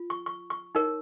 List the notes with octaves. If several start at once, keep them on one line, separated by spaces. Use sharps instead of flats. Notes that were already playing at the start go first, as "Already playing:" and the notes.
Already playing: F4
C#6
C#6
C#6
D#4 A#4 C#5